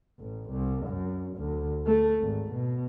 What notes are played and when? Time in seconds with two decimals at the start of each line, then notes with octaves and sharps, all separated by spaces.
0.20 A1
0.51 C2
0.86 F#2
1.37 D2
1.86 A3
2.20 G#1
2.52 B2